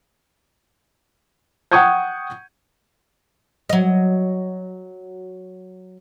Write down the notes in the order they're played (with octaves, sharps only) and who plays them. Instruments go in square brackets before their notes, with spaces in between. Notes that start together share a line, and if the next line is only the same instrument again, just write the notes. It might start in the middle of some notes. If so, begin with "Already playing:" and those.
[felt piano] F#5 G5 C#6 D#6 G6 G#6
[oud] F#3 D#5